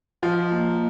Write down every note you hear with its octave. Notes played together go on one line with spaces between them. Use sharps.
F3 D#5
A#3